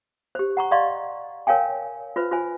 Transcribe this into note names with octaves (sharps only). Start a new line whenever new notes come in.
G4 C5
F#5 A#5 C#6
D5 D#5 F5 C6 C#6
A#4 C#5 F5 G5 G#5
F4 B4 C5
F4 C5 G#5